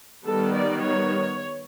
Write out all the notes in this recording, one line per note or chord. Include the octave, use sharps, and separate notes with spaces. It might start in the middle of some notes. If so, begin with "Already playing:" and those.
D#3 G3 B3 A4
D5
C#5